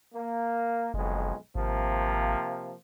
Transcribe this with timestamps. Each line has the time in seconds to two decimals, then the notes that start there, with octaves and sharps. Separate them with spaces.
0.12 A#3
0.94 F#1 B1 F2 G#3
1.55 G#1 C3 F3 A#3